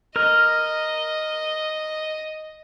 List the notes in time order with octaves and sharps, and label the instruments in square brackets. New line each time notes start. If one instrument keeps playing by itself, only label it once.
[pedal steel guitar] A#4 F6 [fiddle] D#5